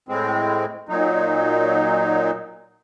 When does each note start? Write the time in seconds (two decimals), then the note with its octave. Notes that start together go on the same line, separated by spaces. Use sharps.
0.09 A2 G#3 C4
0.89 A#2 F#3 D#4